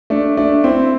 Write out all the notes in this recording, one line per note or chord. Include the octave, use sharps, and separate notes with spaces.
A3 D4
A3 D4
C4 E4